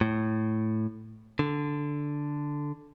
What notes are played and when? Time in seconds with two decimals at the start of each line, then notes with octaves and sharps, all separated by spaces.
0.01 A2
1.39 D3